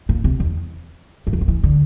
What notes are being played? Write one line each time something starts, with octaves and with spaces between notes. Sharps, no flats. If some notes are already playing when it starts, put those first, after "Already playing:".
A#2
C3
E2
G2
F2
F3
E3
D3